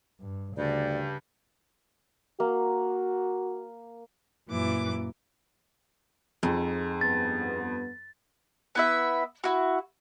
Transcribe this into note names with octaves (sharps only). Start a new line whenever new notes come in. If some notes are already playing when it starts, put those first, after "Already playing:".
G2
D2 G2 C#3 D5
A#3 F#4
F#2 A#2 E3 D6
F2 G#2
G2 B3 A6
B3 E4 E5
E4 F#4